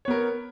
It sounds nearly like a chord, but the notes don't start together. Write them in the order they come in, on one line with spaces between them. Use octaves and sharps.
C#5 B3 A#4